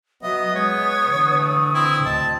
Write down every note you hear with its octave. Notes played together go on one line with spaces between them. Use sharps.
F#3 B3 D#5 E5
G#3 C#5 D#6
D3 E3
A3
C4 E4
D2 D#5 A5